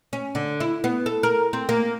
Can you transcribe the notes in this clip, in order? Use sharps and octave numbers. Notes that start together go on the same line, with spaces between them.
C#4
D3
E4
B3
A4
A#4
C4
A#3